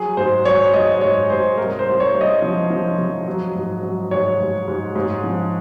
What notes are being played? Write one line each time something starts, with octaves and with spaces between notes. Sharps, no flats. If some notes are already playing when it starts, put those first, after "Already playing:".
Already playing: F#3 G#4
G#2 C5
F#3 C#5
G#2 D#5
G#2 C#5
G#2 C5
C2 A#4
C5
C2
C#5
C2
D#5
F3
F3
F3
F#3
G#2
F#3
G#2 C#5
G#2
G#2
G#2
F3